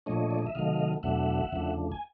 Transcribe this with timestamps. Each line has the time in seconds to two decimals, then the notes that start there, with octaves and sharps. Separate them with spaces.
0.06 A#2 F3 A3 D4 C#5 D#5
0.31 D5
0.39 D#5
0.47 E5
0.55 C3 D#3 F#3 A3 D#5 F5
1.03 E2 B2 F#3 A3 D4 E5 F#5
1.52 E2 C#3 F3 A3 D4
1.92 G#5